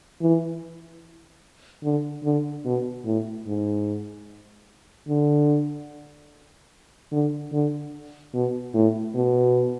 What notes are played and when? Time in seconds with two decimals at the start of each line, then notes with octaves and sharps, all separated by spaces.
0.22 E3
1.84 D3
2.24 D3
2.65 B2
3.05 A2
3.47 G#2
5.09 D3
7.12 D3
7.53 D3
8.34 B2
8.74 A2
9.15 B2